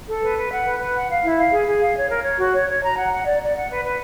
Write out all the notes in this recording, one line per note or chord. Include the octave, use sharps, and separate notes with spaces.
A4
B4
B4
F#5
B4
B4
F#5
F5
E4
F5
G#4
G#4
F5
C#5
A#4
C#5
F#4
C#5
C#5
A#5
F#5
F#5
D5
D5
F#5
B4
B4